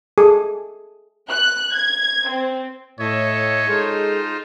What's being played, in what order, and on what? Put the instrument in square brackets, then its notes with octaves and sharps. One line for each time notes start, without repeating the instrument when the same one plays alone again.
[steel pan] G#4 A4
[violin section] F#6
G#6
C4
[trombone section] A2 [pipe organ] A4 D#5 E5 [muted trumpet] C#5
[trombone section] G#3 G#4 A4 [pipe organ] D#4 F4 C5